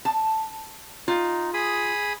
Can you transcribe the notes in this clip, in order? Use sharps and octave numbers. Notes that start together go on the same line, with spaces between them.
A5
D#4 F4
G#4 B5 D#6